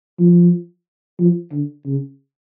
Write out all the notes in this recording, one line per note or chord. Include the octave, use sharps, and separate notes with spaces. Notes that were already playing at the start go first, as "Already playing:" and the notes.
F3
F3
D3
C#3